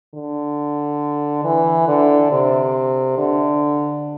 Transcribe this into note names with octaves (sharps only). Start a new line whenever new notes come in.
D3
E3
D3
C3
D3